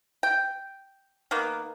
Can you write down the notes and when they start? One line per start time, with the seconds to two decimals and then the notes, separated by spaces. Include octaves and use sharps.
0.23 G5
1.31 D#3 A#3 B3